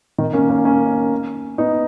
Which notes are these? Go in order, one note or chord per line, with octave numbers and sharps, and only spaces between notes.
D#3
A#3 C#4
A#3 C#4
A#3 C#4
B3 D#4